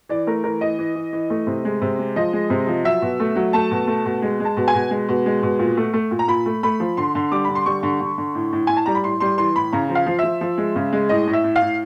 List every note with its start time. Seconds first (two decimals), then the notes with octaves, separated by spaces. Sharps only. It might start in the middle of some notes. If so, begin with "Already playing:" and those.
0.09 E3 D5
0.27 A3 A#4
0.44 E3 A#4
0.61 E3 D#5
0.79 E3
0.95 E3
1.13 E3
1.30 A3
1.47 C3
1.65 G#3
1.82 C3
1.99 G#3
2.16 F3 D#5
2.33 G#3
2.50 C3
2.67 F3
2.84 F#3 E5
3.02 B2
3.20 A3
3.36 F#3
3.53 A3 A5
3.71 B2
3.87 A3
4.05 B2
4.22 G#3
4.40 G#3
4.45 A5
4.57 B2
4.68 G#5
4.74 B2
4.91 G#3
5.09 B2
5.26 G#3
5.43 B2
5.59 A#2
5.77 A3
5.94 A3
6.11 A#2
6.19 A#5
6.28 A#2 B5
6.46 A3
6.63 A3 B5
6.80 F3
6.97 D3 C6
7.15 D3
7.31 G3 D6
7.45 D3 B5
7.55 C6
7.66 G3 C#6
7.83 D3
8.01 D3
8.18 D3
8.35 A2
8.53 A2
8.67 A2 G#5
8.77 A5
8.86 G3 A#5
8.95 B5
9.03 A2 C6
9.20 G3 C6
9.38 E3 C6
9.56 A2 B5
9.73 C#3 A#5
9.90 F3
9.95 F5
10.06 F3
10.19 F3 E5
10.41 F3
10.58 G#3
10.76 C#3
10.93 G#3
11.09 A2 D#5
11.27 A2
11.33 E5
11.44 A2
11.56 F5
11.62 A2